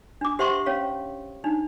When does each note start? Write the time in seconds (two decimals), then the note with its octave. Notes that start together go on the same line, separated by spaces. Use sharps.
0.21 D4 D6
0.39 G4 C5 E5 F#5 C6 C#6
0.66 C#4 C#5 F5
1.44 D4 D#4